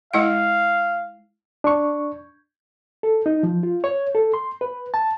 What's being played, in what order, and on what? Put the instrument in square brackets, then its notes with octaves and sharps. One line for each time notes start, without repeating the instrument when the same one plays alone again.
[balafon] G#3 E4 F#5 [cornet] F5
[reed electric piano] D4 C#6
A4
D#4
F3
F4
C#5
A4
C6
B4
A5